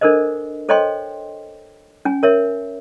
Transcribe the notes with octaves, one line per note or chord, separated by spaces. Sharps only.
D4 A4 A#4 C5 D#5
A4 C5 C#5 D#5 G5 C6
C#4 G#5
A#4 C#5 E5